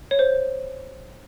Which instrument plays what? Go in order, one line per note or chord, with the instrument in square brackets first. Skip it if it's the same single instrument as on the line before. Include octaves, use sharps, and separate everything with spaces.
[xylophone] C#5
C5